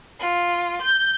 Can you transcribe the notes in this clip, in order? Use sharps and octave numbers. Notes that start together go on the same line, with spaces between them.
F4
G6